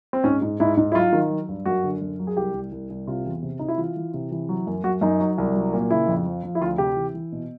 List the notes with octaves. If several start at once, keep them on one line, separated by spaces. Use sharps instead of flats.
C4
G#2 C#4
G#2
G#2 E4
G#2
E4
F#3 F4
D#3
F#3
G2
F#2 F#4
D3
F#2
F#3
G#4
C2 G4
C2
C2
C2
C3 F4
E2
C3
C3 D#4
E4
E3 F4
E3
C3
E3
F#3
F#2
F#2 F#4
F#2 D#4
F#3
C2
F#3
A#2
C#3 E4
F2
F3
F3
E4
D2 F4
C3 G4
E3
E3
B2